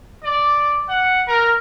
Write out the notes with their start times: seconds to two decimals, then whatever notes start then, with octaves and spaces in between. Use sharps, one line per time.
0.24 D5
0.89 F#5
1.28 A#4